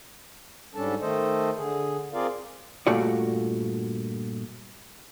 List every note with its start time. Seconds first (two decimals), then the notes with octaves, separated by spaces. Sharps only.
0.75 G#2 G3 C#4 D4 A4 A5
1.01 D#3 A3 A4 C5 D#5
1.57 D3 G#4
2.13 C4 F4 G#4 A#4 D5 F5
2.87 G2 A#2 A3 F4 F#4 D5